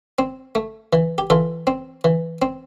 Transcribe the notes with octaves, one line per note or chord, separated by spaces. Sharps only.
C4
A3
E3
G4
E3 F4 A4
C4
E3
C4